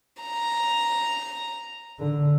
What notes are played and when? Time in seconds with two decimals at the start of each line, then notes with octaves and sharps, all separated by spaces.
0.23 A#5
2.00 D3